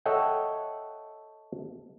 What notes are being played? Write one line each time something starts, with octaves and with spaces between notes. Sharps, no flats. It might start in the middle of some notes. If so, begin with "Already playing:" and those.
A4 C#5 D#5 E5 F#5 G5